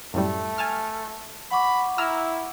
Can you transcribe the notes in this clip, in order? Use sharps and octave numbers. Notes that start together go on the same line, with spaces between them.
F#2 A2 G3 A3
G#5 A5 F6
F#5 B5 C#6 D6
E4 A#5 E6 F6